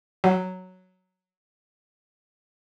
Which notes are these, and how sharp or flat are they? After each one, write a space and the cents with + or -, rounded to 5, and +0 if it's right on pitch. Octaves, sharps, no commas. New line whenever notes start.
F#3 +0